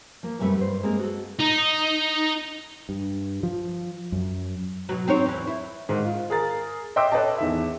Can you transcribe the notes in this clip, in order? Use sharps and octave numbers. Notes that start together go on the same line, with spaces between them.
F3 A#3
F#2 C3 G3 A3 B4
G2 C5
G#3 A#3 C4 G#4 A#4
F#4 A4
D#4
G2
F3
F#2
B2 F#3
C4 D#4 C#5
E2 E3
E4
G#2 D#3
F4
G#4 A#4 A6
D#5 E5 G5 C6 D6 E6
A4 B4 C#5 D#5 G5 A5
E2 D#3 E5